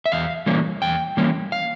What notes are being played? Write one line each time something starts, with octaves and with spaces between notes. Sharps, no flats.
E5
E2 F5
E3 G3 A#3 C#4
E2 G5
E3 G3 A#3 C#4
F5